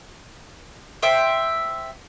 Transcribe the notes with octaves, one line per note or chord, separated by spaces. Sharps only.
C5 E5 G5